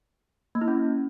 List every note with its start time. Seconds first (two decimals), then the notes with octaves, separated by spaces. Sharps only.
0.55 A#3
0.61 E4
0.68 C#4